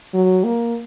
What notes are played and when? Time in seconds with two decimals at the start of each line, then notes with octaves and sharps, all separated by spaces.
0.14 F#3
0.44 A#3